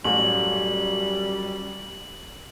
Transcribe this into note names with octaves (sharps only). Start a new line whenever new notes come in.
A1 F#2 G3 F#7